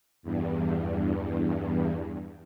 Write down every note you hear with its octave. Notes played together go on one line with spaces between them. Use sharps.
E2 G2